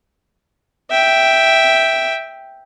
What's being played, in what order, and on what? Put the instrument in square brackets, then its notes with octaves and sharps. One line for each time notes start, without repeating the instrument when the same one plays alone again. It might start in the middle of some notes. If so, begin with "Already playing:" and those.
[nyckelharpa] E5 G5